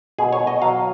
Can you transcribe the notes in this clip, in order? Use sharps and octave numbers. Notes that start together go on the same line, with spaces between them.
B2 G#4
C#5
B2
D#5
F#3 F5